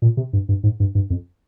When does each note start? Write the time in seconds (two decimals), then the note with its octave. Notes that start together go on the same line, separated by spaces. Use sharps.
0.02 A#2
0.17 C3
0.33 G2
0.49 G2
0.63 G#2
0.80 G2
0.95 G2
1.10 F2